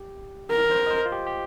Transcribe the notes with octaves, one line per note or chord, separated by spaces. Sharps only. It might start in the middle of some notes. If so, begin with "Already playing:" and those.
Already playing: G4
A#4
C5
D#5
C5
F4
G4
G4